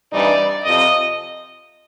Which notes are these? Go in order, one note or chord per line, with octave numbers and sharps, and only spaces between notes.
G2 E3 G3 C4 D#4 D5
F2 C3 F3 D#5